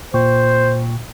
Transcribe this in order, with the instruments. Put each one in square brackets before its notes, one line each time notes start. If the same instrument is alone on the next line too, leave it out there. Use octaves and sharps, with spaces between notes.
[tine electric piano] A#2 G5 C#6 [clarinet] C5